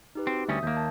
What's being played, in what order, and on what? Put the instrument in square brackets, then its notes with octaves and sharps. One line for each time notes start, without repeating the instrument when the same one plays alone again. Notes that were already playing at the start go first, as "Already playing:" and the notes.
[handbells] D#4 G4 B4
[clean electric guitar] C4 [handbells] F#4
[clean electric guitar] D2 G3 C#4 [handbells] E5 D#6
[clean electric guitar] D#2 A#3 [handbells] G6
[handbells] A5